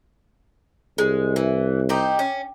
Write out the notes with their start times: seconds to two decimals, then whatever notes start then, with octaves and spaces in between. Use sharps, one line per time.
0.98 C2 G#3
1.36 E3
1.89 C4 D#4 G4
2.19 C#4